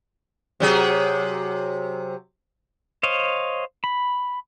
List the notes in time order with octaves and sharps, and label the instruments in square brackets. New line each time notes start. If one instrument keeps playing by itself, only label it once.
[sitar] C3 F#3 G#4
[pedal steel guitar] C5 C#5 D#5 F5
B5